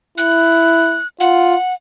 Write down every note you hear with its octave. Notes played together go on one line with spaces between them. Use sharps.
E4 F#6
F4 F#5